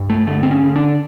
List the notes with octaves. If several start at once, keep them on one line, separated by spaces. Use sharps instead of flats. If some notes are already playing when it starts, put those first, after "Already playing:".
Already playing: G2
A3
D3 A3
C4
C#4
D3
D4